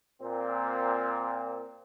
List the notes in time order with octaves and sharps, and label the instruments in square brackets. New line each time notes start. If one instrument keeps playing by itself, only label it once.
[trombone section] A#2 C4